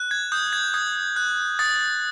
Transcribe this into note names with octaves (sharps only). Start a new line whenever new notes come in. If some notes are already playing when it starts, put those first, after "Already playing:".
Already playing: F#6
G#6
D#6 G6
G#6
D#6 G#6
F#6
D#6 A6